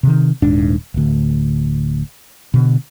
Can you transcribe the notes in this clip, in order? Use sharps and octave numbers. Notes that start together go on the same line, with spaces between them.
C3 D#3
D#1 G#2 D4
D1 D2
B2 D3